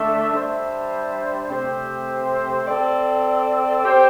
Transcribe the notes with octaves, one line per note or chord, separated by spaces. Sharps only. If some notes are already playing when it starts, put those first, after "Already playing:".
Already playing: D3 A3 D4 A4 E5
G3 D4 C5 E5
C3 A3 C4 G4 C5
C4 A4 D5
C4 G4 C5